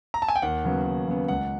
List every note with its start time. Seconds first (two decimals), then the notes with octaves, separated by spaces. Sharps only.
0.14 A#5
0.22 A5
0.28 G#5
0.36 G5
0.42 D#2 F#5
0.65 C#3 F#3 B3
0.86 D#2
1.08 C#3 F#3 B3
1.28 C#2 F#5